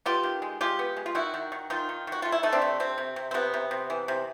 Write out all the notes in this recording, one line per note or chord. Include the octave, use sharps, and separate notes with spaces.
B3 F4 G4
D#3
G#3
G#3 F4 G4
B3
G#3
F4
D#3 E4 F#4
D#3
D#3
D#3 D#4 F4
D#3
D#3 F#4
A3 F4
E4
A3 D#4
C4 D4
C3
C3 C4
C3
C3
C4
C3 B3
C3
C3
E3
C3